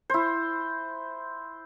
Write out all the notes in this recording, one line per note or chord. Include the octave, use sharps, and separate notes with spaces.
E4 C5